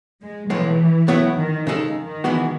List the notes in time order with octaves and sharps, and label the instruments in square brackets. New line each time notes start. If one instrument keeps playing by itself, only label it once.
[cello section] G#3
[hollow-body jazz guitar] B1 A2 G#3 [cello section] E3
[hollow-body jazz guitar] A2 F#3 B3 E4
[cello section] D#3
[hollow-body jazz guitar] C#3 G#3 D#4 A4
[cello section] D#3
[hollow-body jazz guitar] E3 G#3 B3 F#4